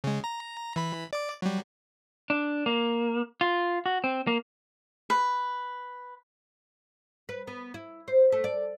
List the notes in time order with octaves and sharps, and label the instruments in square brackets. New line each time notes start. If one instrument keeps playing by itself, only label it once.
[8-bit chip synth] C#3 G#3
A#5
E3 B5
D5 D6
F#3 G3
[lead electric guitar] D4
A#3
F4
F#4
C4
A#3
[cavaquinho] B4
[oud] B4
B3
E4
C5
A3
D5